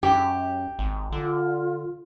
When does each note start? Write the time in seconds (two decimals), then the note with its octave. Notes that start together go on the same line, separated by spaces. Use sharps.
0.03 F#2 G4
0.79 G#1
1.12 D3 F4